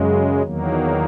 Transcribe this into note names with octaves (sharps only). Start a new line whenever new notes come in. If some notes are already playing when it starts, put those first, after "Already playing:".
Already playing: F#2 C#3 G#3
E2 D#3 F#3 A#3